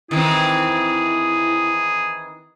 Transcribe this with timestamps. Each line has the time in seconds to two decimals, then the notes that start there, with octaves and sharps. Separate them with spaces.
0.11 D#3 E3 C4 E4 G#4